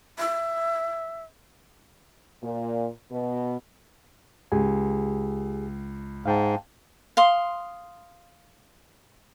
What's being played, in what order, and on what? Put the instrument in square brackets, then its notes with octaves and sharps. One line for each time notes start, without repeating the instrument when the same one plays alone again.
[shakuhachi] E5
[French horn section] A#2
B2
[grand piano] C#2 [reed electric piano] G4 G#4 G#5
[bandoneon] G#2 [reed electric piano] F5 G5 A5
[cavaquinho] F5 C6 D#6